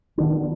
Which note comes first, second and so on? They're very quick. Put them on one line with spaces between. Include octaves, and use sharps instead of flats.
D4 D#3 B3